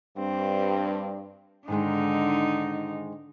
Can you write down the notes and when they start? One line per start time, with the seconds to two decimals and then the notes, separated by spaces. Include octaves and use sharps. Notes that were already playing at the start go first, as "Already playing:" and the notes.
0.18 G2 C4
1.68 G#2 D3 D#3 G#3 D#4